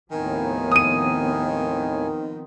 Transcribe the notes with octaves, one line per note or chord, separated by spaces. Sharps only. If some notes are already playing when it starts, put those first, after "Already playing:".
D#2 A2 D#3 F3 B3 C4 G#5
D#6 D#7